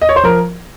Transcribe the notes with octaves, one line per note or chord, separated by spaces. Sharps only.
D#5
C#5
C5
F3 A#4